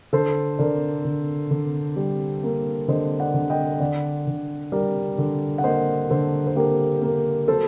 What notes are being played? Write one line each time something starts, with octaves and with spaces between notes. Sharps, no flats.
D3 A4 C5
D3 A#4 D5
D3
D3
G3
A#3
D3 C5 D#5
D5 F#5
D3
D#5 G5
D3 D5 F#5
D3
G3 A#4 D5
D3
F#5
A#3 C5 D#5
D3 A4 C5
C5
A#3 G4 A#4
A#3
F#3 A4 C5